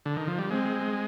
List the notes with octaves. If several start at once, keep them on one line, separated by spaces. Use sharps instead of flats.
D3
D#3
F3
G3
G#3 C4